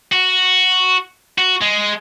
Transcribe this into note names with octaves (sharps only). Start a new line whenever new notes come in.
F#4
F#4
G#3